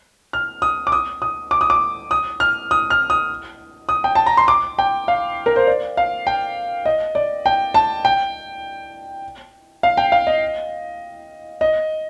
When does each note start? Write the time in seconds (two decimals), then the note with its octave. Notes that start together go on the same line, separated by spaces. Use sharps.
0.33 F6
0.62 D#6
0.87 D6
0.92 D#6
1.22 D#6
1.51 D6
1.61 D#6
1.70 D6
2.11 D#6
2.40 F6
2.71 D#6
2.90 F6
3.10 D#6
3.89 D#6
4.04 G5
4.15 A5
4.26 A#5
4.37 C6
4.48 D6
4.78 G5
5.08 F5
5.46 A#4
5.56 C5
5.67 D5
5.97 F5
6.27 G5
6.85 D#5
7.15 D5
7.46 G5
7.74 A5
8.05 G5
9.83 F5
9.97 G5
10.12 F5
10.27 D#5
11.61 D#5